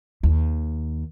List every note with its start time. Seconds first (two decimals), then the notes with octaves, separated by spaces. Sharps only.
0.23 D#2